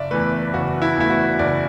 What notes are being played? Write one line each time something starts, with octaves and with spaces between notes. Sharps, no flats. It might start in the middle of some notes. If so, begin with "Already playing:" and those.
Already playing: F#1 D5 E5
E2 E3 A3 B4
F#1 F#4
E4
E2 E3 A3 E4
F#4
F#1 D5